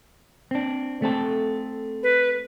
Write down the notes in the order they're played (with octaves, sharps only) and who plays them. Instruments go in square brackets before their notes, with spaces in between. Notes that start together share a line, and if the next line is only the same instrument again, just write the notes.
[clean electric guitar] C4 D4
A3 C4 A4
[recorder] B4